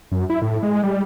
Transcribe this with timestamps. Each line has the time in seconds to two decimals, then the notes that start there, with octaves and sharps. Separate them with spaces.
0.12 F#2
0.30 E4
0.42 A2
0.63 G#3
0.83 G3